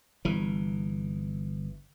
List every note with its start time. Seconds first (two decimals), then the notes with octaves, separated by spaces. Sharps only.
0.25 G1 E3